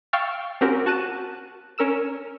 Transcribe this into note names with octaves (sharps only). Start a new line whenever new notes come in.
F5 G5 C#6 E6 F6 A6
C4 C#4 F#4 G4 A#4
F#4 A5 F#6 D#7 E7
C#4 A#4 E6 E7